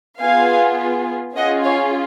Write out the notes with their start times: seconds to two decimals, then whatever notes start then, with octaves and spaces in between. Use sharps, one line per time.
0.22 B3 F4 G#4 F5 G#5
1.36 C#4 F4 G#4 D#5 F#5
1.65 C#5 F5